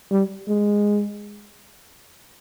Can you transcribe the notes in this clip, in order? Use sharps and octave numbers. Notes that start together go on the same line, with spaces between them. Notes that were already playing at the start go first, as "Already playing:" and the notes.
G3
G#3